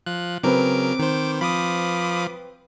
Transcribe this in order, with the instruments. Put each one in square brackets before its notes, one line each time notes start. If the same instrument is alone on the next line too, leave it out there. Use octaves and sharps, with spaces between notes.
[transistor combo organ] F3 [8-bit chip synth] F#6
[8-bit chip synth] C#3 F#3 A#4 [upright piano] C4 B4 [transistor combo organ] D6
[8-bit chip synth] D#3 C5
[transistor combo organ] F3 [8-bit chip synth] B5 D6 D#6